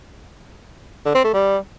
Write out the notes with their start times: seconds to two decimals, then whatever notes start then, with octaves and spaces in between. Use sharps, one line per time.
1.05 D3
1.15 C4
1.24 A3
1.33 G3